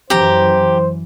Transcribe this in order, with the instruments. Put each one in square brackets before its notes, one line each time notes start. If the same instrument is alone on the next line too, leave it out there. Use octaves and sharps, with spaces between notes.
[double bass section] F#2 E3 [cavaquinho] G4 A#5 [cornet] C5